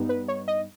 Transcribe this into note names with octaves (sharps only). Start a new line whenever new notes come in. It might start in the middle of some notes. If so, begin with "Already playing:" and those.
Already playing: G2 G3 B3 D#4
B4
C#5
D#5